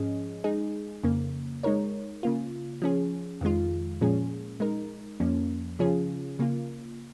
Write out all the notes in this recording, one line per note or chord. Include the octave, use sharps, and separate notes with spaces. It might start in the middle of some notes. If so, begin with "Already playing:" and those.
Already playing: G#2 F3 C#4 G#4 D#5
G#3 D#4 G#4
F2 C#3 A#3
G#3 D#4 A#4 C#5
C#3 A#3 F4
F3 C#4 G#4
F2 D#3 G#3 F4
A#2 F3 G#3 C#4 G#4
G#3 D#4 A#4
F2 F3 A#3 C#4
C#3 F3 C#4 F4 G#4
C#3 A#3 F4